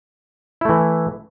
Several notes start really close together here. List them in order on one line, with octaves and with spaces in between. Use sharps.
E4 A3 E3